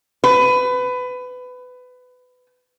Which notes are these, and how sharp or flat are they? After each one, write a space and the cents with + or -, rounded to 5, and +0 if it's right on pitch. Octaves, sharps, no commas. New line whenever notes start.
B4 +20